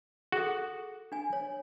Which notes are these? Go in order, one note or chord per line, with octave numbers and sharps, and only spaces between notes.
F#4 G#4 A4
D4 G#5
C#5